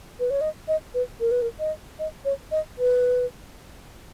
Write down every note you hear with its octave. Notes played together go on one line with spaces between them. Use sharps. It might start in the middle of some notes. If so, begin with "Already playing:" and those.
B4
C#5
D#5
D#5
B4
A#4
B4
A#4
D#5
D#5
C#5
D#5
B4